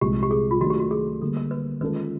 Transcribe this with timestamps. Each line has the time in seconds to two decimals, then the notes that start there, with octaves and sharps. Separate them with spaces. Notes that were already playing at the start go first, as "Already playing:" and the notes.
0.01 C2 A#2 F3 G#3 G4
0.23 G4
0.31 G#4
0.51 F4
0.61 D#3 F#3 A3 D4 F#4
0.70 G4
0.80 F#4
0.91 G#4
1.22 D3 G3 A#3 A4
1.37 A#4
1.51 B4
1.81 D#3 G#3 C#4 F4 A4 B4
1.96 A#4